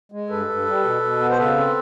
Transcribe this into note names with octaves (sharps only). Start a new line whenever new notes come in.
G#3
G2 A4 B4
G2
G3
B2
B2
B3
C5
C#3 A4 B4
C4